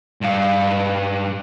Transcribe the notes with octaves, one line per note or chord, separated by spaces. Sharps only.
G2 F5